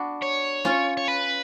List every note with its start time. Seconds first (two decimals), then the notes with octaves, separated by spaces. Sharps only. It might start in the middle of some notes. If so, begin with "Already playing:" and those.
Already playing: B3 D4 F#4
0.23 C#5
0.65 C#4 F4
0.97 C#5
1.08 B4